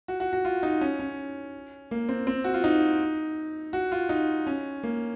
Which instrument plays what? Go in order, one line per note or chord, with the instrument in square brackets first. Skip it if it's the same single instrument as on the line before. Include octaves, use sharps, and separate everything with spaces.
[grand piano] F#4
F#4
F#4
F4
D#4
C#4
C#4
A#3
C4
C4
F#4
F4
D#4
F#4
F4
D#4
C#4
A#3